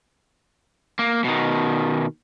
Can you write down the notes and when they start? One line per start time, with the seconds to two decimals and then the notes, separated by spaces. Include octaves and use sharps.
0.99 A#3
1.24 B2 D#3